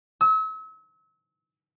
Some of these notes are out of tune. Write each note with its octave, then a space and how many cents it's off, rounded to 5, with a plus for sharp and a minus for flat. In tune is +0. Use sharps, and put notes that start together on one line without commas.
E6 -40